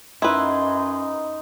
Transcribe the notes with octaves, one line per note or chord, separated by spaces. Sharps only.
F#2 D#4 E4 B4 C6